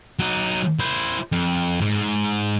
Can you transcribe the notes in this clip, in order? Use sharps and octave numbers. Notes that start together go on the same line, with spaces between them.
F#3 D#4
E4 C5
F2
G#2